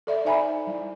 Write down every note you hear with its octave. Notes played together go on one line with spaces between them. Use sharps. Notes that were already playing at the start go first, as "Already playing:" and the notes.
A4 D5 E5
D#4 C5 E5 G#5 A#5 B5
G3 E4